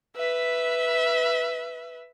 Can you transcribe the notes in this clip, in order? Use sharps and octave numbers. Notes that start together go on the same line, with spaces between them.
B4 E5